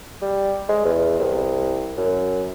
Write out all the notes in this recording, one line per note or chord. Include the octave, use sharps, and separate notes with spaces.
G3
G#3
E2
C2
F#2